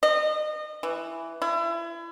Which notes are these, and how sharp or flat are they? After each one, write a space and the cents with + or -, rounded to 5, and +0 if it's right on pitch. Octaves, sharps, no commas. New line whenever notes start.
D#5 -30
E3 +5
E4 +35